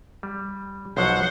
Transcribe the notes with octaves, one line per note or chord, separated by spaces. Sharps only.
G3
B1 F3 F#3 C5 F#5